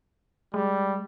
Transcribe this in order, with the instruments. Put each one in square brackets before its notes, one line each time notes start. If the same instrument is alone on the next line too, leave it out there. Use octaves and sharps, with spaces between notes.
[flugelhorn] G3 [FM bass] G#3